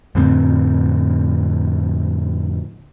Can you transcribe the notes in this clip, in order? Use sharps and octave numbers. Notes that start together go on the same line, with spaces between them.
F2 A2 D3 C4